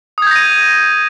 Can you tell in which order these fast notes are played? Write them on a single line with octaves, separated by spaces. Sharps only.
D#6 G#6 G6 A#6 D#7